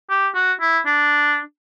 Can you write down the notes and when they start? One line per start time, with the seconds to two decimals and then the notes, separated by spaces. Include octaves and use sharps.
0.10 G4
0.35 F#4
0.61 E4
0.86 D4